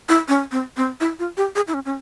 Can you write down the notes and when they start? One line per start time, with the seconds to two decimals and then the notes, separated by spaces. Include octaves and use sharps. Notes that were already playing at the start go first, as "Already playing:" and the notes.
0.09 E4
0.28 C#4
0.52 C4
0.77 C4
1.00 E4
1.19 F4
1.37 G4
1.56 G#4
1.68 E4
1.74 C#4
1.85 C#4